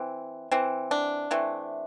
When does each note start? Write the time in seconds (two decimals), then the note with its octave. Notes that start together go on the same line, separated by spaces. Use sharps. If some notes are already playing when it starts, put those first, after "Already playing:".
Already playing: E3 C4
0.52 E3 C4
0.91 D4
1.31 E3 A3 C4